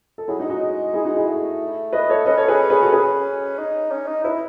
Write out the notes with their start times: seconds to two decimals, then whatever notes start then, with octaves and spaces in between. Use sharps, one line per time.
0.18 A4
0.28 F#3 E4 G#4
0.39 D#4 F#4
0.44 G#3
0.50 D#4 F#4
0.94 E4 G#4
1.05 D#4 F#4
1.15 E4 G#4
1.26 A3
1.93 B4 D#5
2.10 A4 C#5
2.26 C#4 B4 D#5
2.37 A4 C#5
2.48 G#4 B4
2.70 G#4 B4
2.82 F#4 A4
2.92 C#4 G#4 B4
3.59 D#4
3.91 C#4
4.08 D#4
4.24 E4 B4 D#5